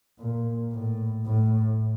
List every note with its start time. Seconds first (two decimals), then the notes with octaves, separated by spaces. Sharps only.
0.19 A#2
0.72 A2
1.26 A2